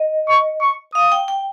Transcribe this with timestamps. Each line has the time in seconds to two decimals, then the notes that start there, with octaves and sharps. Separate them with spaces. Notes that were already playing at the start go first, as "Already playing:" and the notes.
Already playing: D#5
0.28 C#6
0.61 C#6
0.94 F5 D#6
1.12 G5
1.28 G5